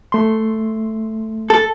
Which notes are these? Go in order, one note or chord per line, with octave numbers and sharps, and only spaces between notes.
A3 C6
A4